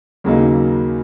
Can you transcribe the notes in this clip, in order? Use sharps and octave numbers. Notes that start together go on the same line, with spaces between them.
D#2 C#3 F#3 A#3 D#4